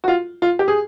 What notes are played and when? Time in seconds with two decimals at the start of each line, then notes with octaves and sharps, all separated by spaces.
0.04 F#4
0.08 F4
0.42 F4
0.59 G4
0.68 G#4